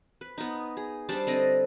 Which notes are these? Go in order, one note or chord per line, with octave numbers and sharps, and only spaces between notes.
B4
B3 D#4
G#4
G3 D4 C5 A5
D3 C4 D#5